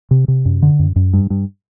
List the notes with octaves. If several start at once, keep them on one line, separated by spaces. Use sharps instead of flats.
C3
C3
F#2
D3
F#2
F#2
G2
G2